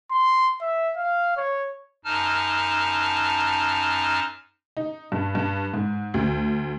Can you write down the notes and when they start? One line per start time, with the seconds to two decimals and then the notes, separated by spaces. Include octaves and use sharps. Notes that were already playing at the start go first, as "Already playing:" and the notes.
0.11 C6
0.61 E5
0.97 F5
1.37 C#5
2.05 F#2 D#4 A5 F6
4.77 D#4
5.12 G2
5.35 G2
5.74 G#2
6.14 D2